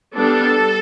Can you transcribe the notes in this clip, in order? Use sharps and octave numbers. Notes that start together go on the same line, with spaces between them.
G3 B3 D4 A4